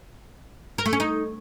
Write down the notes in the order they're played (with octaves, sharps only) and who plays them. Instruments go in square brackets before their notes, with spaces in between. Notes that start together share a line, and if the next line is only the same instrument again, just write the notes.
[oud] A#4
A3
C#4
D#4